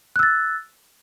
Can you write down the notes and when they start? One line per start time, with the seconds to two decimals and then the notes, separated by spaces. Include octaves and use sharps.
0.16 F#6
0.19 E6
0.23 A6